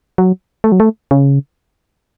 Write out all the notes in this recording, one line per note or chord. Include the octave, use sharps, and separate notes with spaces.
F#3
A3
F#3
A3
C#3